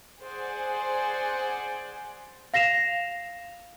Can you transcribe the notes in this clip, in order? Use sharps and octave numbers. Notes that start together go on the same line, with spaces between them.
G#4 C5 D5 F#5 G#5
F5 A#6 C7 E7 F7